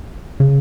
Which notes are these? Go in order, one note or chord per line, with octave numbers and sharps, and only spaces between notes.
C#3